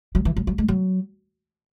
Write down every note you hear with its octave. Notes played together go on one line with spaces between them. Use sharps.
F#3
E3
F#3
F#3
G#3
F#3